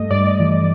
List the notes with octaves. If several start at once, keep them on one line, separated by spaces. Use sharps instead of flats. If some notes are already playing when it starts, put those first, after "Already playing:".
Already playing: G2 A3 D#5
G2 D5
E3